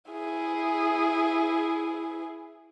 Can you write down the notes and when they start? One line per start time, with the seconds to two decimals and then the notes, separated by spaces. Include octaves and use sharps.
0.11 E4 G#4